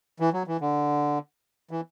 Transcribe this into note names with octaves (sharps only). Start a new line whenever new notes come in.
E3
F#3
E3
D3
E3